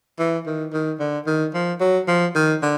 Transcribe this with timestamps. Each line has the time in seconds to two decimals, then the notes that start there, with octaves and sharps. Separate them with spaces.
0.19 E3
0.47 D#3
0.73 D#3
1.00 D3
1.27 D#3
1.54 F3
1.80 F#3
2.08 F3
2.35 D#3
2.62 D3